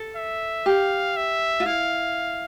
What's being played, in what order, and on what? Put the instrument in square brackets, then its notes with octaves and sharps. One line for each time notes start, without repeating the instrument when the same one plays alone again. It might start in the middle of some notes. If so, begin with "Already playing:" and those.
Already playing: [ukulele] A4
[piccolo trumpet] E5
[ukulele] G4 [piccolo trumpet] F5
[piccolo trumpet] E5
[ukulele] F4
[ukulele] E4 [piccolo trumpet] F5